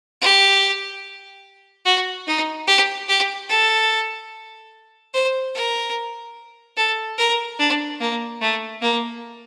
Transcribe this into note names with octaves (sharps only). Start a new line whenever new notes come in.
G4
F#4
D#4
G4
G4
A4
C5
A#4
A4
A#4
D4
A#3
A3
A#3